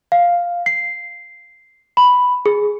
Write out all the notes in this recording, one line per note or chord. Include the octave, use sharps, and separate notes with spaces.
F5
C7
B5
G#4